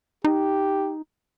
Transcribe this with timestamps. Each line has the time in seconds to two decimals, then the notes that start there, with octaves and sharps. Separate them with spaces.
0.24 D#4 G4